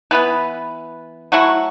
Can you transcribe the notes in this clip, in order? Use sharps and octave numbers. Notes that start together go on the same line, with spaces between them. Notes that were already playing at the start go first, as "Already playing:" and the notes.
E3 B3 E4 B4
F#3 A3 E4 F#4